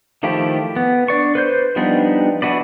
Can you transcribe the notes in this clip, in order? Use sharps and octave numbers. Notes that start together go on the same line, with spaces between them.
D#3 F3 A3 E4 G4
B3
D4 D5 C#6
B4 C5 G6
F3 G3 B3 D4 D#4
D4 E4 F#4 B4 D5